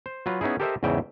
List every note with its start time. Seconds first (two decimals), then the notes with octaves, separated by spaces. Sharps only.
0.06 C5
0.26 F#3 F4 B4
0.41 B3 C#4 D#4 E4 G#4
0.60 G4 A4 A#4 C5 D#5 E5
0.83 E2 G#2 C#3 E5 G5